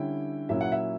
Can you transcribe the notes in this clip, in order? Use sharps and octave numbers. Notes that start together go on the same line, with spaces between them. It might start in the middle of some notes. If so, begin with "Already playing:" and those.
Already playing: D3 G3 C#4 E4 G5
A#2 F#3 C#4 E4 E5
F#5
E5